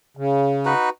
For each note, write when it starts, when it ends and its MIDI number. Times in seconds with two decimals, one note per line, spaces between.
0.17 0.74 49
0.65 0.89 63
0.65 0.89 66
0.65 0.89 71